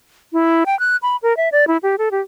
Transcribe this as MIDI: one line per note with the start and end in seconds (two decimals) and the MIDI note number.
0.33 0.64 64
0.66 0.78 79
0.79 0.96 90
1.02 1.16 83
1.23 1.36 70
1.37 1.49 76
1.52 1.65 74
1.68 1.77 64
1.83 1.96 67
1.98 2.09 69
2.11 2.21 67